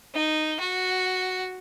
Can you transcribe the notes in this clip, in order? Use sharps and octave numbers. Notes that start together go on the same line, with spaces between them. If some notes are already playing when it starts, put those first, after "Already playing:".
D#4
F#4